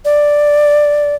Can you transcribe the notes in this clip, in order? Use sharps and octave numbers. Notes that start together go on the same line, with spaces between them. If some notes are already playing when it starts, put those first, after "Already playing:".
D5